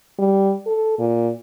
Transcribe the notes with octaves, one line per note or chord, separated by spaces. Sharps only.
G3
A4
A#2